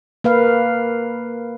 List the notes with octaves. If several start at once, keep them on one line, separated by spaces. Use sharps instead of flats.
A#3 B4 F5